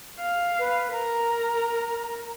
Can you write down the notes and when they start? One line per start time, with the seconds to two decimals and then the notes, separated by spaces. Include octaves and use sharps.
0.20 F5
0.59 B4
0.92 A#4 A#5